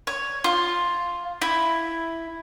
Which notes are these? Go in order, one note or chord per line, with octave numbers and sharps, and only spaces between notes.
C#5
F4
E4